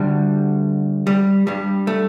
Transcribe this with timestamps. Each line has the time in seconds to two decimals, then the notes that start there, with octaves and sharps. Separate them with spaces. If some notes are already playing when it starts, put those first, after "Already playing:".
Already playing: D2 D3 G3
1.07 G3
1.47 G2 G3
1.87 A3